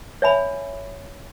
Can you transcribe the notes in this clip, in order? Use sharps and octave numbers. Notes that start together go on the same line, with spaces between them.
C#5 E5 G#5 B5